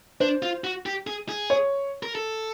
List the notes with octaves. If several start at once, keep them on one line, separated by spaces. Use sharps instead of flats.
D4 C5
F4
F#4
G4
G#4
G#4
C#5
A#4
A4